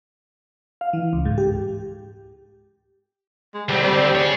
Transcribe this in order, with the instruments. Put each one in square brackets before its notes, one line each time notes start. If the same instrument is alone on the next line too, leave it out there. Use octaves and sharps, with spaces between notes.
[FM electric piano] F5
E3
C#2
G#2
G4
[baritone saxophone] G#3
[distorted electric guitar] D2 C4 [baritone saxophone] G3
[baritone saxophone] G3
[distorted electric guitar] G#4 C#5